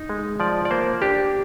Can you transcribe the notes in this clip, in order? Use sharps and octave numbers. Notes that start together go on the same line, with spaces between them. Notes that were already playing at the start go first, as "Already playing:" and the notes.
Already playing: D#4
G#3
F3 D5
D5
A#3 C5
D4 G4